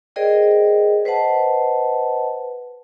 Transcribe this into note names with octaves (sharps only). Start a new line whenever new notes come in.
G#4 A#4 C5 D5 D#5 G5
B4 C5 D#5 F#5 A5